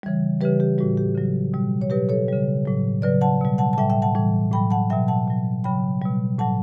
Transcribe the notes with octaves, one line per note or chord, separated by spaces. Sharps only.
C#3 E3 G3
C#3 E3 G3 G4 B4
G4
A2 G3 F#4
G4
C#3 F#3
B2 G3
C#5
B2 F#3 G4 B4
A4 C#5
C#3 G3
A2 F#3
C#3 F#3 B4 D5
F#5 A5
B2 G3
F#5 A5
A5
A2 G3 E5 G5
E5 G5
F#5 A5
A2 E3 G3
A2 F#3 G5 B5
F#5 A5
B2 F#3 E5 G5
F#5 A5
B2 F#3
C#3 F#3 G5 B5
B2 G3
A2 F#3 F#5 A5